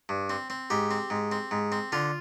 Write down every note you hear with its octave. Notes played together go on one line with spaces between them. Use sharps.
G2
C4
C4
G#2 G4
C4
G#2
C4
G#2
C4
D3 F4